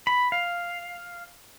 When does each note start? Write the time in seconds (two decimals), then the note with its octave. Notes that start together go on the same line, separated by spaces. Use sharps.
0.07 B5
0.32 F5